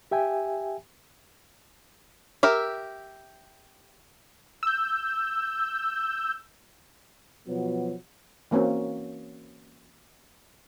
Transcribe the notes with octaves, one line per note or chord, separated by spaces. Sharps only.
G4 E5 G5 G#5
G4 A#4 E5
E6 G6
B2 F3 F#3 B3
E3 A#3 C4 C#4 F#4